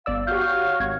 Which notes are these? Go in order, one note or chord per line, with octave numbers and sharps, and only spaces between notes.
G1 D5 F5 E6
F#4 G4 C#5 F5 C#6 G6
G#1 G#6